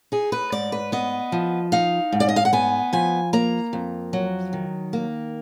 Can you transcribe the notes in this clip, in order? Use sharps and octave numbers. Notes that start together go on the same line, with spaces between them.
D#4 G#4
B4
G#2 D5
B4
B3 D#5
F3
D#4 F5
G#2
D5
D#5
F5
F#5
B3 G#5
F3 G#5
A#3 A#5
F2
F#3
D#3
A#3